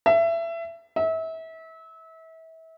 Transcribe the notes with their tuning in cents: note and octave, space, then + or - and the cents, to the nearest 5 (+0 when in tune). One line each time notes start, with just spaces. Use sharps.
E5 +25
E5 -30